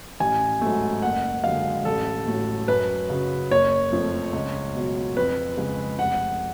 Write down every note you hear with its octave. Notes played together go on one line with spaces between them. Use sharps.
A1 G#5
G#2 F#3 A3
F#1 F#5
F#2 D3 G#3 F5
A1 A4
A2 F#3 A3
F#2 B4
C#3 F#3
F#1 C#5
F2 F3 A3
C#2
B2 F#3
F2 B4
C#3 G#3
F1 F#5